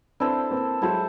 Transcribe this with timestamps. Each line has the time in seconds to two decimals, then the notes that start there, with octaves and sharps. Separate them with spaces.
0.20 C4 D4 E4 A4 C5
0.50 A#3 C4
0.81 F#3 G#3 E4 A4 C5